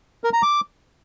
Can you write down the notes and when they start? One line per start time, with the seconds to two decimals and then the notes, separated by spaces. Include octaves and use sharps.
0.24 A#4
0.33 A#5
0.43 D6